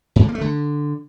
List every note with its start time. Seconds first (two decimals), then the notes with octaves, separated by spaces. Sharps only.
0.16 G#2
0.22 D3
0.28 A#3
0.35 A3
0.41 D3